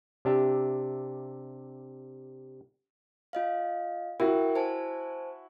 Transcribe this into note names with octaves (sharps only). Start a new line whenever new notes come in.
C3 D4 G4 E5
F4 D#5 F5
E4 F#4 A#4 E5 G5
C5 G#5 A5